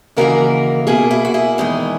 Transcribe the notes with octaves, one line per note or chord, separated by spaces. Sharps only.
D#2 C#3 E3 A#3 F#4 A#4
B2 A#3 E4 G#4
E4 G#4
F#4
E4 G#4
E2 D#3 G#3